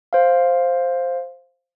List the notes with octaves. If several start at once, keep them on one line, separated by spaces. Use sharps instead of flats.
C5 F5